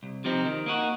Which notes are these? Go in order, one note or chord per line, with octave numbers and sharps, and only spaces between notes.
C2
C3 F3 C4 D#4
D#3
A#3 D#4 F#4